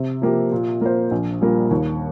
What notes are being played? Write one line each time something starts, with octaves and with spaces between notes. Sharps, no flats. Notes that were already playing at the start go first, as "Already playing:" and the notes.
Already playing: C3
F3 A#3 G4
A#2
A#3 F4 C5
A#1
A#2 G3 A#3
D#2